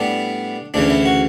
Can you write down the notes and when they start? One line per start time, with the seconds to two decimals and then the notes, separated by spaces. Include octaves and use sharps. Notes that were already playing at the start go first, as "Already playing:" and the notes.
Already playing: A2 G3 B3 D4
0.74 D2 C#3 E3 D4
0.90 E4
1.05 F#4